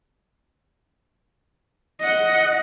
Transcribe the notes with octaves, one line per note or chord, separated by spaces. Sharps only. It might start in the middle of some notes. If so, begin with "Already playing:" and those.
D#5 F#5